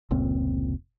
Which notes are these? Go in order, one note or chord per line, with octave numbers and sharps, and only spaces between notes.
F1 C#2 A#2 C4